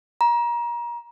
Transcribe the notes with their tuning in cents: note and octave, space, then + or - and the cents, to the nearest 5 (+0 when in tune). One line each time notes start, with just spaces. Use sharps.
A#5 +30